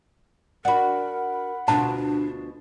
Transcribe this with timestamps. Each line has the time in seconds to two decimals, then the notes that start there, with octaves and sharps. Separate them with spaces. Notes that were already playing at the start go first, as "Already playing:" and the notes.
0.65 D4 F#4 A#4 F#5 B5
1.68 D2 B2 D4 F4 A5